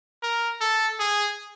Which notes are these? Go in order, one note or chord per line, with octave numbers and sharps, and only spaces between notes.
A#4
A4
G#4